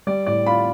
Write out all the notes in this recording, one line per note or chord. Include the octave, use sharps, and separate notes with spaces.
G3 D5
A2 D5
F4 B5